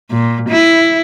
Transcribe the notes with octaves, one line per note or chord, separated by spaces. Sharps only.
A#2
E4